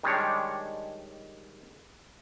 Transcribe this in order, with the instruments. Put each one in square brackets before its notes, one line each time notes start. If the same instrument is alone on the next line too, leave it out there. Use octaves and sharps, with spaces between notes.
[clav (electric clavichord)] D#3 G3 G#3 D4 C#5